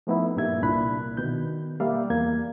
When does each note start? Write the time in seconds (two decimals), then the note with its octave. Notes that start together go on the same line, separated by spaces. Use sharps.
0.07 F3 A3 B3 D#4 E4
0.36 G2 A#2 G3 A#3 E5 G#6
0.62 C2 A#2 D4 E4 B5 F#6
1.17 B2 D#3 G6
1.80 G3 A#3 D5 E5 F5
2.10 E2 A#3 G#6